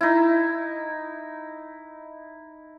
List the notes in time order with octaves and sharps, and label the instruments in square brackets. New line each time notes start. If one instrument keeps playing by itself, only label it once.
[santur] D#4 E4